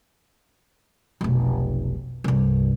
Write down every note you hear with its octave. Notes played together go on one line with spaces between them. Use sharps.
F1 B1
C2 G2